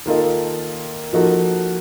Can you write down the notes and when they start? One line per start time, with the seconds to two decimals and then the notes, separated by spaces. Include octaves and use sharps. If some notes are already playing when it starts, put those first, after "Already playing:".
0.06 D#3 A#3 F4 A4 D#5
1.13 F3 A#3 D#4 F#4 A4